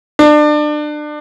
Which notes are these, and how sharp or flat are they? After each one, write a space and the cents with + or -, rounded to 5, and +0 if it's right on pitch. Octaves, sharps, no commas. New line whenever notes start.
D4 +30